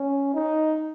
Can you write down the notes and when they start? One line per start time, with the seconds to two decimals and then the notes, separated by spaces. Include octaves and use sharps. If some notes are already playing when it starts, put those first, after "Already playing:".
Already playing: C#4
0.34 D#4